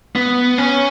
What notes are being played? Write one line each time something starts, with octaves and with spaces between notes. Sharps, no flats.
B3
C#4